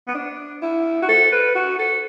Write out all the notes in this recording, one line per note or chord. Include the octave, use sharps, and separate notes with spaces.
B3
D4
E4
F#4
A4
B4
F#4
A4